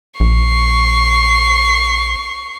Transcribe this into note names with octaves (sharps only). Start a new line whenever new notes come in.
A#1 C#6 C7